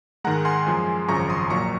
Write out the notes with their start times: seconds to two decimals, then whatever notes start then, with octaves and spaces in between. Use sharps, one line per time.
0.24 G#2 D#3 G#3 F#5 A#5
0.45 G#5 C6
0.66 F#2 F3 G#3
1.08 G#1 F#2 C#3 F3 A#5 C#6
1.30 C6 D#6
1.50 A#1 A#2 F#3 A#5 C#6